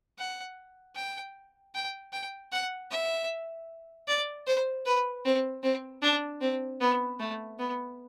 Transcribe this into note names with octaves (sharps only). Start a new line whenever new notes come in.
F#5
G5
G5
G5
F#5
E5
D5
C5
B4
C4
C4
D4
C4
B3
A3
B3